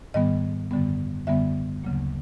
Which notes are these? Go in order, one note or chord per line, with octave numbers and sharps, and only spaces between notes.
G#2 D#3 G3 B3 D#5
F#2 D3 G3 B3
F#2 D3 G3 B3 E5
D2 C#3 F#3 A#3